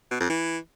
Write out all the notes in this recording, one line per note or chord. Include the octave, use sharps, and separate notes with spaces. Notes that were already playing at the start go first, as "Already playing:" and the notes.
B2
F2
E3